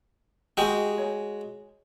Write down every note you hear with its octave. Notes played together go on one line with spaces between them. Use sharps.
G#3 F#4 G4 D#5
C#5 G#5